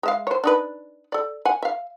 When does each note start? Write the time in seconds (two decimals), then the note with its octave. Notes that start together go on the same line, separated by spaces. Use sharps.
0.03 G#3 E5 F5
0.27 C5 C#5
0.44 D4 D#4 B4
1.12 A4 D5
1.45 F#5 G#5
1.63 E5 F5